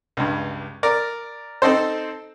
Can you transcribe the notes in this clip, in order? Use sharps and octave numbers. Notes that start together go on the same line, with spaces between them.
C#2 G2
A#4 D5
C4 D#4 A4 C5